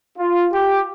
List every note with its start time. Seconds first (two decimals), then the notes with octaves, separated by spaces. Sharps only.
0.18 F4
0.52 G4